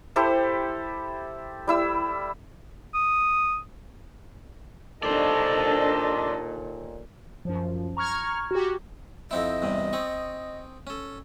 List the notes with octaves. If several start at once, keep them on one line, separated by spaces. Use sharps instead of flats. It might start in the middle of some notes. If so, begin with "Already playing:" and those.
E4 G4 A4 C5
G3 E4 E6
D#6
D#2 A#2 D4 A4 C5 D5 D#5
F#2 F3
A#5 C#6 F6 G#6
F#4 G4
F2 C4 E4 D#5
E2 G2 C3
C4 G#4 C#6
C#4 A4